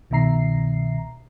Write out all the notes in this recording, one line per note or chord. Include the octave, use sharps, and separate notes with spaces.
C2 B2 D#3 E5 A#5 C7